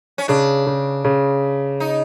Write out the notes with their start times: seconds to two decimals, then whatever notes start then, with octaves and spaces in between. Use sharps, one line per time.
0.18 C#4
0.28 C#3 D4
0.67 C#3
1.05 C#3
1.80 D#4